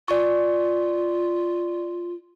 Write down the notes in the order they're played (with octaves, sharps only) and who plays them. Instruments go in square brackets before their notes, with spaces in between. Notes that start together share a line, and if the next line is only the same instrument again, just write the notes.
[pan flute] F4 [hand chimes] D5 C#6